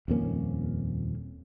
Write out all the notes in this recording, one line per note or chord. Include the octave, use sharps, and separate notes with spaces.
D#1 F2 A#3 C#4